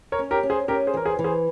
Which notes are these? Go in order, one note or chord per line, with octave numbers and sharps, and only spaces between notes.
A#4 C#5
C#4
G4 A#4
C#4
G#4 C5
C#4 G4 A#4
G#4 C5
E3 A#4
G#4 C5
E3
G#4 C5